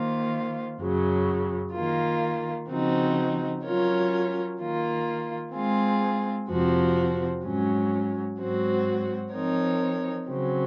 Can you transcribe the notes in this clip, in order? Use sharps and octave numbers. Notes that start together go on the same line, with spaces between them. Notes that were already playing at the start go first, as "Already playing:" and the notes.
Already playing: D#3 A#3 F4 C5
F#2 C#3 F#3
D#3 A#3 F4
C#3 F3 C4 D#4 F#4
F#3 C#4 F4 A#4 C#5
D#3 A#3 F4
G#3 C4 F4 G#4
F2 C3 F3 C4 F#4
G#2 F#3 C#4
G#2 F#3 C4 F#4
F3 C4 D#4 A#4 C#5
C#3 F#3 C4